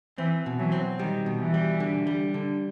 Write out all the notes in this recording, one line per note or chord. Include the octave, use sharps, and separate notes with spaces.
E3 C4
B2
E3 F#3
C4
D#3 G3
B2
E3
G3
D3
G3
D3